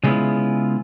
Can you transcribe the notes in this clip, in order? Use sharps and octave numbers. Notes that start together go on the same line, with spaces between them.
C#3 G#3 A3 B3 E4 F4